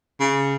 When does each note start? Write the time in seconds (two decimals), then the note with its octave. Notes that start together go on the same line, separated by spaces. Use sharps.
0.20 C#3